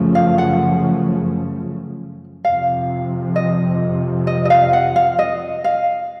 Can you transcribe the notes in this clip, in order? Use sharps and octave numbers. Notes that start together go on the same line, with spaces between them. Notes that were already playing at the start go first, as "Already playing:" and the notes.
Already playing: F#2 C#3 F3 A3
F5
F#5
F2 C3 F3 F5
D#5
D#5
D#5
F5
F#5
F5
D#5
F5